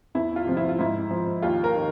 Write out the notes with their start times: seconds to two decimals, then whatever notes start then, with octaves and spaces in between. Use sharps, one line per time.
0.15 E2 E4
0.36 F4
0.47 C3 F3
0.57 E4
0.69 F4
0.78 G#2 E4
1.11 F3
1.42 D#2 F4
1.64 A#4
1.74 D#3